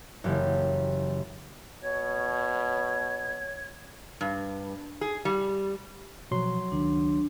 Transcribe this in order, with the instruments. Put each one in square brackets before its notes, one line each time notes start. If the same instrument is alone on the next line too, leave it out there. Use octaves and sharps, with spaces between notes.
[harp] F#1 C#3 E3 G4
[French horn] B2 [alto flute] C#5 [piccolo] G#6
[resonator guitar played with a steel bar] G2
G#4
G3
[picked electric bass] B2 F3 [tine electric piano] F#3 C6
[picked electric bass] C#2 D#3 [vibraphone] D4